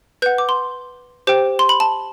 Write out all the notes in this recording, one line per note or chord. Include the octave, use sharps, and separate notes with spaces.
B4 F#5 G6
D6
C6
G4 C5 G5
C6
B5
A5